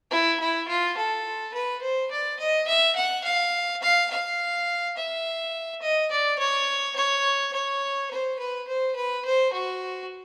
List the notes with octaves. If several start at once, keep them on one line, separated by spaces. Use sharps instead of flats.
E4
E4
F4
A4
B4
C5
D5
D#5
E5
F#5
F5
F5
F5
E5
D#5
D5
C#5
C#5
C#5
C5
B4
C5
B4
C5
F#4